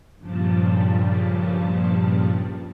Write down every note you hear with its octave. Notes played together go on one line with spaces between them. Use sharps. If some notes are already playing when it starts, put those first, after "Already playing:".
G2 A#2 C#3 F3 G3 A5